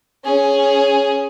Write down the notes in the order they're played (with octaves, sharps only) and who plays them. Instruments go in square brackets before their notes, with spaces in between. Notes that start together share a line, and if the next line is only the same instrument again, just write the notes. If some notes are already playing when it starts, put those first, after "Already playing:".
[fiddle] C#4 G#4